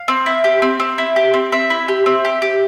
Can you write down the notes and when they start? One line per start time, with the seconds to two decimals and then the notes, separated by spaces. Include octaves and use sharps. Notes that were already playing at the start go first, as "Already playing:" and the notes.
Already playing: F5
0.08 C4
0.26 E4
0.44 G4
0.62 C4
0.80 C4
0.98 E4
1.16 G4
1.34 C4
1.52 C4 E5
1.70 E4
1.88 G4
2.06 C4
2.25 G4
2.42 G4